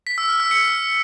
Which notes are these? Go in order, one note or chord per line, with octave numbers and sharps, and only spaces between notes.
B6
E6
F6
E6
C#7